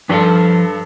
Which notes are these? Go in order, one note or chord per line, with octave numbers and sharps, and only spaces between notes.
G2 F3 A4 C6